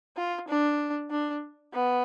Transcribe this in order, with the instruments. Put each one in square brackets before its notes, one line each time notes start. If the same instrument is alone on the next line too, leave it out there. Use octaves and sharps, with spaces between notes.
[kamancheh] F4
D4
D4
B3